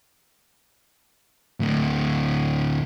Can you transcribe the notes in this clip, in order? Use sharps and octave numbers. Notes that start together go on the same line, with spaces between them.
D2 A2